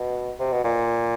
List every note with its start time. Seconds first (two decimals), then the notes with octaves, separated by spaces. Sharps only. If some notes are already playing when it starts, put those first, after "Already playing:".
Already playing: B2
0.39 C3
0.52 B2
0.64 A#2